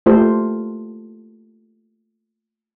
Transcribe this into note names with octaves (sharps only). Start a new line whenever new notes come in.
A3 A#3 F4 G4 A4 C5